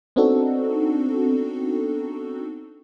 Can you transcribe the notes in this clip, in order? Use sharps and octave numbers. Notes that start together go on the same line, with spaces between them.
B3 C4 D4 D#4 F#4 A4